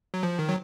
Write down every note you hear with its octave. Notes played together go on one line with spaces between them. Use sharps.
F#3
F3
D#3
F#3